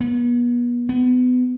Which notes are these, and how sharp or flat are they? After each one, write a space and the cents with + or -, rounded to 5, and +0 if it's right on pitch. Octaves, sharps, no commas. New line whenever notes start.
B3 -35
B3 +25